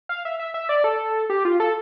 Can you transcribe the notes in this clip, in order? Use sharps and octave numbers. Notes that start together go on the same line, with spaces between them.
F5
E5
E5
E5
D5
A4
G4
F4
A4